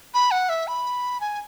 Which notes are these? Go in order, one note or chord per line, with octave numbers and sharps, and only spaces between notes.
B5
F#5
E5
B5
G#5